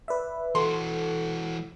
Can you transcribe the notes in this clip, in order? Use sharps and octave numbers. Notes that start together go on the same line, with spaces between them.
B4 D5 E5
E3 F#4 A4 C6